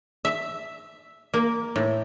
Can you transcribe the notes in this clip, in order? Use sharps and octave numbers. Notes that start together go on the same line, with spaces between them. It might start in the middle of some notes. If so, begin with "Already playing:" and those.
E5
A#3
A2